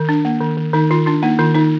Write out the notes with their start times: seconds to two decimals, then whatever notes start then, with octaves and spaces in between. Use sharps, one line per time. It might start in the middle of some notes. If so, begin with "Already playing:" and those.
Already playing: D#3
0.09 D4
0.25 A#3
0.41 D#3
0.57 D#3
0.73 D#3 D#4
0.90 D#3 F4
1.06 D4 F4
1.22 A#3 D#4
1.39 D#3 F4
1.55 D#3 D#4